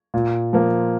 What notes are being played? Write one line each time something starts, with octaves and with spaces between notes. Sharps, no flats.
A#2
F3 A#3